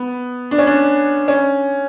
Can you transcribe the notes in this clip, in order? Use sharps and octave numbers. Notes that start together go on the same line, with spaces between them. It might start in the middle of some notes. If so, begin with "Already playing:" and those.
Already playing: B3
D4
C#4
D4
C#4